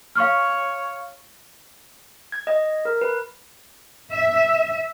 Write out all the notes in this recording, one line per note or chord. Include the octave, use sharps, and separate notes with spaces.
C#5 F5 C#6 F6
G#6
D#5
A#4
B4
E5